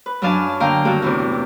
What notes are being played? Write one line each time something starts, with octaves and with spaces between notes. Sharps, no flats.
B4
F#2 F#3 D4 F5 G#5 A5
D3 A#3 F5 G5 A#5
G2 D#3 A#3 F#4 A4
E2 A2 C3